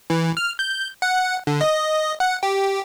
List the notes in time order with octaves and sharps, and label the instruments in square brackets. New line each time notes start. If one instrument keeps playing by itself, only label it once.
[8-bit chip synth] E3
F6
G6
F#5
D3
D#5
F#5
G4